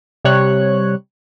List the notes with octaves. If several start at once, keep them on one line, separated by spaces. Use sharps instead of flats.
C3 G3 C#5 F#6